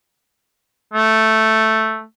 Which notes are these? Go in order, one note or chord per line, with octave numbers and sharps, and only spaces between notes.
A3